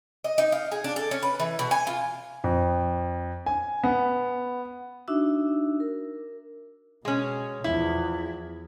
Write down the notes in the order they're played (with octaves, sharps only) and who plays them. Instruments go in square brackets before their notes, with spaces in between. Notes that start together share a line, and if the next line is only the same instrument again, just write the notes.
[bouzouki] D#5
D#4
F5
G#4
D4
A4
C#4
B4
E3
B2
G#5
F4
[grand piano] F2
G#5
B3
[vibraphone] D4 D#4 F#4 E5 E6
A#4
[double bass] B2 [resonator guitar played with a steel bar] G#3 C#4
[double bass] E2 F3 [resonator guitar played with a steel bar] E4